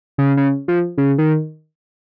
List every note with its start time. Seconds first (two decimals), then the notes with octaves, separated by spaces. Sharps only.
0.18 C#3
0.37 C#3
0.68 F3
0.98 C#3
1.18 D#3